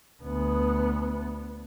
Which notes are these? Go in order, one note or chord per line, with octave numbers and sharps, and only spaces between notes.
D2 B3